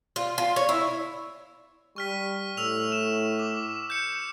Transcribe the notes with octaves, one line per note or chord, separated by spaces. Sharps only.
F4
F4
C#5
E4
G3 C#6 F6 B6
A2 E6 F7
E7
D6
G6 C#7